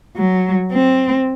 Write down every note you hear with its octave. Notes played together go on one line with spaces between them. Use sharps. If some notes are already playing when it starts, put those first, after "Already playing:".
F#3
C4